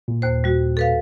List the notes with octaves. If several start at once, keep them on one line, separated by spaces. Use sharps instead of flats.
A#2
D#2 C5
G3 F#4
A4 B4 F5